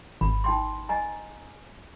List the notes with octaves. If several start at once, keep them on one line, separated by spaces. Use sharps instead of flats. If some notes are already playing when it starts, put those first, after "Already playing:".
G#1 B5
D#4 G5 C6
D#5 G#5 A#5